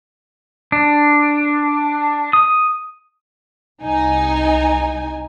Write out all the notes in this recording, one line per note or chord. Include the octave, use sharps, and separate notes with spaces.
D4
D#6
C2 D#4 G#5